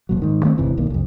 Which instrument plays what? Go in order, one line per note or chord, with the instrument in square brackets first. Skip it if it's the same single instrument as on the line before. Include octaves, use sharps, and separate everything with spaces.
[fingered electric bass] E1 A#2 F#3
G#2 D#3
D#3 A3 A#3 C4
G1 E2 C3 E3
D1 B1 D#3 A#3
C2 F2